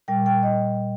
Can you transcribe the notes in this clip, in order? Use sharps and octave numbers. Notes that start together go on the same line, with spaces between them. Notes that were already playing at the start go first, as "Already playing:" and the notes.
A#2 G3 G5
G5
D#5